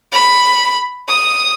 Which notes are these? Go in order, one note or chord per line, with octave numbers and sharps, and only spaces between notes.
B5
D#6